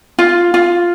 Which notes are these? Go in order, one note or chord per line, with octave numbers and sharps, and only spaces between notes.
F4
F4